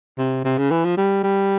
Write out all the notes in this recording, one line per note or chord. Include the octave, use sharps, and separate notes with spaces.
C3
C3
C#3
E3
F3
G3
G3